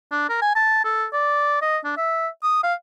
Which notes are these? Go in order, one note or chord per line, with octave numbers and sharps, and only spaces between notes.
D4
A#4
G#5
A5
A4
D5
D#5
D4
E5
D#6
F5